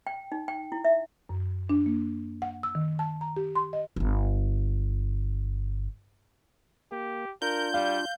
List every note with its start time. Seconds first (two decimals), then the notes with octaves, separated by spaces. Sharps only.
0.07 G5
0.32 D#4
0.48 G5
0.72 E4
0.85 E5
1.29 F#2
1.69 D4
1.86 A#3
2.42 F#5
2.63 E6
2.75 D#3
2.99 A5
3.21 A#5
3.37 G4
3.55 C6
3.73 D#5
3.96 D1 G1
6.92 A#3 G4
7.42 D4 F4 A#4 G6
7.74 G3 F5